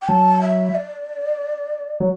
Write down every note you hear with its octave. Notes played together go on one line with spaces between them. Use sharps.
G5
F#3 A5
E5
D5
F#3